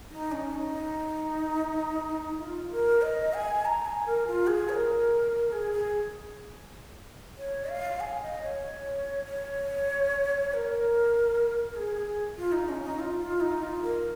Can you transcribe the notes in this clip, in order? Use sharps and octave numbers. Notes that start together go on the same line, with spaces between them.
D#4
C#4
D#4
F4
A#4
D#5
G#5
A#5
G#5
A#4
F4
G#4
C#5
A#4
G#4
G#4
C#5
F5
G#5
D#5
C#5
C#5
C#5
A#4
G#4
G#4
F4
D#4
C#4
D#4
F4
F4
D#4
F4
A#4